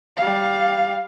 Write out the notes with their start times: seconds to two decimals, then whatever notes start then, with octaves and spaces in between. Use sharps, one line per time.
0.17 G3 F5